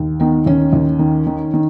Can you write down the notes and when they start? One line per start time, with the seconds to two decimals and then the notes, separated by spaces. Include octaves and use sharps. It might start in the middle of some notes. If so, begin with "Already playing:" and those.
Already playing: D#2
0.20 D#3 B3
0.46 D#2 C#4
0.73 D#2
0.99 D#3
1.27 D#3
1.54 D#3